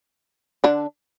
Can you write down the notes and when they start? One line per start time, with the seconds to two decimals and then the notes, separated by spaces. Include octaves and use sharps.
0.64 D3 D4